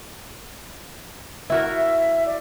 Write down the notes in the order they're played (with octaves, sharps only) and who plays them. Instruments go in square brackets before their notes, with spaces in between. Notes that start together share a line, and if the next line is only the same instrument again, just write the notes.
[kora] E4 F#4 A#4
[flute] E5
D5